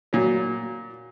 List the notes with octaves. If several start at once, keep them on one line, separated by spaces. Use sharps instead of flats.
A#2 F#3